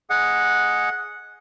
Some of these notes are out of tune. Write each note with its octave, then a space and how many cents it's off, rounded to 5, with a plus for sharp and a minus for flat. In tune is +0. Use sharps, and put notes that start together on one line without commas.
G#4 +0 D#5 +0 F#5 -5